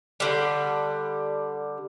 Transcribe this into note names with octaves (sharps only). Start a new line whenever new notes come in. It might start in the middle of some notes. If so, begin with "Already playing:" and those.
D3 G3